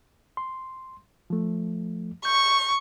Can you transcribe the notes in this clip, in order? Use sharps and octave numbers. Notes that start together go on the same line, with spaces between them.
C6
F3 A3
C#6 G6